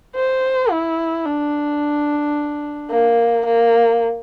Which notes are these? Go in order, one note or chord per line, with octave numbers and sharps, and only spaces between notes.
C5
E4
D4
A#3
A#3